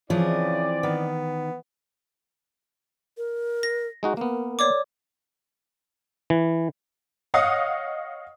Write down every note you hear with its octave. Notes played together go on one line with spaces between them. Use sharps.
C#3 E3 F3 C4 E4 G#4 D5
D#3 B3
A#4
A#6
G#3 D#4 F#4
A#3 B3 A#4
C#5 D5 D6
E3
C#5 D#5 F5 F#5 D#6